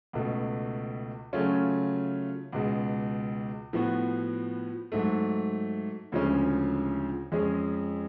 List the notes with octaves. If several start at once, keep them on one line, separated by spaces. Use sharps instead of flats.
C#2 B2 A3
C#3 F#3 A3 C#4 F4
C#2 B2 G#3
A2 F3 B3 F#4
G#2 F#3 A3
D2 C#3 F3 G#3 C#4
F2 F3 G#3 C#4 G#4